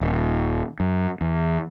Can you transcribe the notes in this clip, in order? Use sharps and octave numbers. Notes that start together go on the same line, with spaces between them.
D#1
F#2
E2